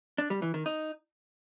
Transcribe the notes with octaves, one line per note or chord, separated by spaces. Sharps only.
D4
G3
E3
D#3
D#4